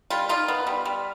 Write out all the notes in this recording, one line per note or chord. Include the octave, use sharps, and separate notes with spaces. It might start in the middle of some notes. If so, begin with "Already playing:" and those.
G3 F4
D#4 F4
B3
G3
G3